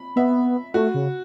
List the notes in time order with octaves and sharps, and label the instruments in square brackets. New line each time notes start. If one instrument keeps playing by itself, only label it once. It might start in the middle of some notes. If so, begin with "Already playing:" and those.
Already playing: [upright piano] B5
[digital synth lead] B3 [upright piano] E5
[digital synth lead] A3 [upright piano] F#4
[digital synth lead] C#3